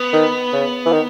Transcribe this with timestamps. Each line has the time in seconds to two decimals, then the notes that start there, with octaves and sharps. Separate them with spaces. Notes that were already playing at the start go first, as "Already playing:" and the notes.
Already playing: B3
0.13 D#3
0.53 C#3
0.86 E3
0.92 D#3